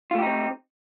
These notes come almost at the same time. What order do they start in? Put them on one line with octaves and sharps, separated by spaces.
F4 A3 G4 D#4 C4